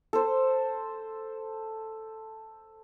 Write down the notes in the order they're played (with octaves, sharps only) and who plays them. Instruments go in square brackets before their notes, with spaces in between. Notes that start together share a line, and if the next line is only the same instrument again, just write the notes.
[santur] A4 C5